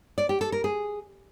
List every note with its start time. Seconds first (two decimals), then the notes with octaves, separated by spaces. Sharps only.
0.18 D5
0.29 G4
0.41 A4
0.52 A#4
0.64 G#4